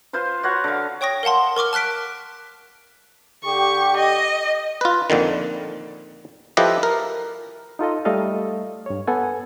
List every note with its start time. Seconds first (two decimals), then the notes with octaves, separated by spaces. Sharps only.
0.13 F4 B4 C5 C6
0.43 F#4 C#5 F#5 B5
0.64 D3 F5
1.01 C#5 G5 C#6 D#6 A#6
1.23 A#4 F5 F#5 A5 C6
1.57 A#4 C#6 D6 F6
1.73 A5 F6 F#6 B6 D7
3.43 D3 G4 C#6
3.96 D#5
4.81 F4 B4
5.10 F2 A#2 D3 D#3
6.57 F3 E4 G4 A4 B4 D#5
6.83 A#4
7.79 D#4 F4 A4 D#5
8.05 G3 A3 A4 D#5 F5
8.86 G2 C#5
9.07 B3 A4 F#5 G#5